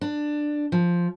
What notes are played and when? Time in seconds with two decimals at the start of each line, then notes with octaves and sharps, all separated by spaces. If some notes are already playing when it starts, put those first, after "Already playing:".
0.01 D4
0.72 F3